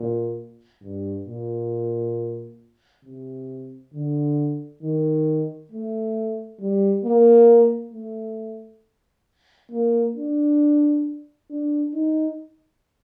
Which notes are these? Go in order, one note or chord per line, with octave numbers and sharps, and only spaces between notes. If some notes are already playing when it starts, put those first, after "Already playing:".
Already playing: A#2
G2
A#2
C3
D3
D#3
A3
G3
A#3
A3
A#3
D4
D4
D#4